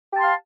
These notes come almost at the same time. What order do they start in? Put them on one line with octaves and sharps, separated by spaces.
G4 A5 C6 F5